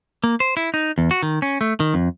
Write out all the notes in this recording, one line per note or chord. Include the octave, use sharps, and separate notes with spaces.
A#3
C5
E4
D#4
E2
F#4
D#3
C#4
A3
D#3
F2